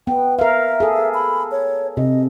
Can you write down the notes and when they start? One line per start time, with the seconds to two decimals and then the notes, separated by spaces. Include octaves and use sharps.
0.07 B3 G5
0.39 A#4 E5 F5
0.80 G#4 A4
1.14 B5
1.51 C#5
1.97 C3 D#5